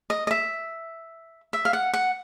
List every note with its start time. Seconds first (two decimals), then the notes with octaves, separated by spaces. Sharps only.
0.10 D#5
0.27 D#5
0.31 E5
1.53 E5
1.65 F5
1.73 F#5
1.93 F#5